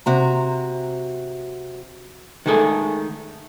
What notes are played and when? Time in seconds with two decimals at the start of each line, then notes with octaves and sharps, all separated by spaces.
0.06 C3 F#4 A#5
2.46 D#3 G#3 A3 G#4 A4